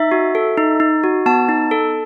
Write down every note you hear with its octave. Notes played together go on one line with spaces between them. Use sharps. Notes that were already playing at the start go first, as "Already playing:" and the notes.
Already playing: D#4 E5
F#4
A4
D#4
D#4
F#4
B3 A5
D#4
A4